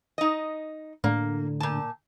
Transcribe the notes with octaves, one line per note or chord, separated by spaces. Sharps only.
D#4 D#5
A2 D3 A#3
A#2 A5